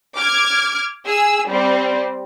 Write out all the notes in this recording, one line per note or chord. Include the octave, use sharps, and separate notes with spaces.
D6 F6 G#6
G#4 E6
G3 C4